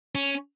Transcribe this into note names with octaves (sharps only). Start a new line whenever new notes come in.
C#4